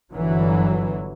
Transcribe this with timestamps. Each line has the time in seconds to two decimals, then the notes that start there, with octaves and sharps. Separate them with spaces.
0.12 G1 E3 F#3